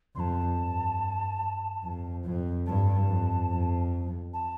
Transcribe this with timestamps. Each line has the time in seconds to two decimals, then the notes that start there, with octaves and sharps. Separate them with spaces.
0.15 F2 A5 C6
0.58 G2
1.83 F2
2.25 F2
2.66 G2 A5
3.08 F2
3.50 F2
4.33 A5